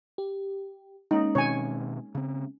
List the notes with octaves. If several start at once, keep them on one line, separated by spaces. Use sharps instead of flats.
G4
G#3 A#3 C#4 D#4
B2 D#3 C4 C#5 G#5
C#3 C4